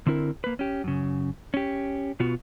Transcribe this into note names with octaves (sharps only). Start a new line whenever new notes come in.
D3 C4 E4 A#4
A#3 B4
C#4 G4
F#2 C#3
C#4 G4
B2 B3 F4 F#4